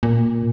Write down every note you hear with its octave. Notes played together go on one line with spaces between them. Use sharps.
A#2